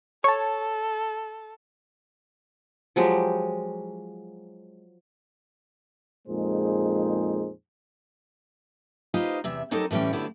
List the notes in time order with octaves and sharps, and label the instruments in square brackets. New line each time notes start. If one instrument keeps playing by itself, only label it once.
[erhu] A4 [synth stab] C#5 A5
[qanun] F3 F#3 G#3 G4
[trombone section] F2 A#2 G#3 D#4 G#4 C5
[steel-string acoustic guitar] D#4 F4 G4 B4 C5 D#5
E2 C3 E5
F#3 C4 D#4 G4 A4 A#4
A2 E3 G3 C#4 G5
D3 F#3 B3 E4 G4